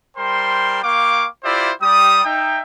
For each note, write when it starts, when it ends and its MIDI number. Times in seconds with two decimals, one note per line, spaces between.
0.17 0.80 55
0.17 0.80 70
0.17 0.80 72
0.17 0.80 79
0.17 0.80 84
0.83 1.27 58
0.83 1.27 77
0.83 1.27 79
0.83 1.27 85
0.83 1.27 86
1.44 1.71 64
1.44 1.71 65
1.44 1.71 67
1.44 1.71 72
1.44 1.71 74
1.44 1.71 76
1.81 2.23 55
1.81 2.23 67
1.81 2.23 87
2.25 2.62 63
2.25 2.62 76
2.25 2.62 79